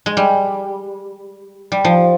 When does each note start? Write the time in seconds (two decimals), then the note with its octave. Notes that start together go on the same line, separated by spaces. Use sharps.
0.06 G#3
0.17 G3
1.72 G3
1.85 F3